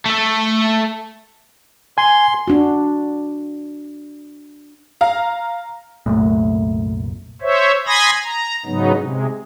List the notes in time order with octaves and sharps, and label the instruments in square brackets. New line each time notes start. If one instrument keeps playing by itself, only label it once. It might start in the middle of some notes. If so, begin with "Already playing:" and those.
[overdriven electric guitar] A3 A4
[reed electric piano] G#5 [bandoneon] C6
[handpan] D4 F#4
[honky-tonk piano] F5 A#5
[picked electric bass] C2 F#2 A#2 [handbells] A3
[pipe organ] C5 C#5 E5
G#5 B5 C6 D#6 G#6 A#6
A#5
G#2 C#3 F#3 B3 D#4
C3 G#3